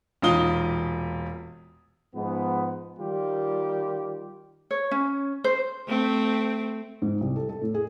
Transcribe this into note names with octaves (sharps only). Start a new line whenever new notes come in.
E1 A#2 D#4 F4 D#6 G7
G#2 F3 B3
D#3 G3 F4 G4
C#5
C#4
C5
A3 C4
G#2
C2
A4
A4
A2
G#4